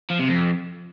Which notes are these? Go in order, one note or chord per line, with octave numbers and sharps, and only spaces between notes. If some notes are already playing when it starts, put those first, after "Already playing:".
F3
C3
F2